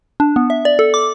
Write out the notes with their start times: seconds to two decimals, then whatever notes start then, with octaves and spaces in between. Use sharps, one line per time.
0.20 D4
0.36 B3
0.50 E5
0.65 D5
0.79 A4
0.94 D6